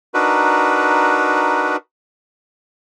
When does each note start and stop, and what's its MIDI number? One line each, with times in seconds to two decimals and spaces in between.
0.14 1.77 62
0.14 1.77 63
0.14 1.77 66
0.14 1.77 70
0.14 1.77 71